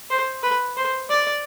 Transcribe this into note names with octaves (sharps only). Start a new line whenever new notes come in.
C5
B4
C5
D5